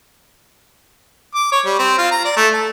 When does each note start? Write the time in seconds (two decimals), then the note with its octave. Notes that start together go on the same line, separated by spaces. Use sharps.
1.35 D6
1.52 C#5
1.66 G3
1.79 C4
1.98 F4
2.11 A#5
2.25 D5
2.37 A3
2.54 A4